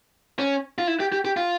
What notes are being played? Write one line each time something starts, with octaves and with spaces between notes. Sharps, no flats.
C#4
F4
E4
G4
G4
G4
F4